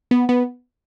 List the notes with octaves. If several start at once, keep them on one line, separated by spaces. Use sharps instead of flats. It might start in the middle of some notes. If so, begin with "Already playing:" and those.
B3
B3